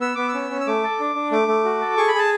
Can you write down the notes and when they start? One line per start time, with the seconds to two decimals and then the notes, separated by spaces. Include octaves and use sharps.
0.01 B3 E6
0.15 B3 D6
0.28 E6
0.34 C#4
0.50 C#4
0.61 E6
0.67 A3 D6
0.83 A4
1.00 D4
1.15 D4
1.31 A3 D6
1.48 A3
1.65 F#4
1.81 A4
1.97 G#4 C#6
2.08 B5
2.14 G#4 A5